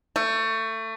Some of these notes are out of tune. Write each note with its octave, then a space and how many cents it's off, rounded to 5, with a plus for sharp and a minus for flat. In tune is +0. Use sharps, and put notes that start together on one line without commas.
A3 +25